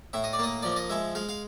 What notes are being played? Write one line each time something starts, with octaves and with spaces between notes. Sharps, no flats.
A2 E5
D#5
D5
A#3 D#5
F3 D5
D#5
G#3 E5
G#3 F5
F5